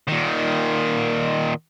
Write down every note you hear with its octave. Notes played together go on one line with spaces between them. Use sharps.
A#2 D#3